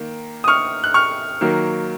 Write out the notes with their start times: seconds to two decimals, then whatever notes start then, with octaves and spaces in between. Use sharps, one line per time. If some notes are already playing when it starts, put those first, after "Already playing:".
Already playing: D#3 A#3
0.44 D#6
0.48 C#6 F6
0.84 F#6
0.94 C#6 F6
1.41 D#3 F#3 A#3